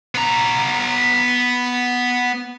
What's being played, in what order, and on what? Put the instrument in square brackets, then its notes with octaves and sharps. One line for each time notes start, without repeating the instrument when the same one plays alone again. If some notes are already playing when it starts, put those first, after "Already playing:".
[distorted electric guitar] B3 A#5